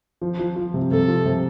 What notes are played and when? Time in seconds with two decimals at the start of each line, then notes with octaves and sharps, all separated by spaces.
0.21 F3
0.39 F3
0.56 F3
0.74 C3
0.91 C3 A4
1.08 F3
1.26 C3